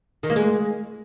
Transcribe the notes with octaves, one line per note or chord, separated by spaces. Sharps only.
D#3
A#3
G#3